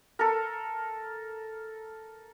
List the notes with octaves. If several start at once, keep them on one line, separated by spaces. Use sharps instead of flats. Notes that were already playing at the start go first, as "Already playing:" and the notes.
A4 A#4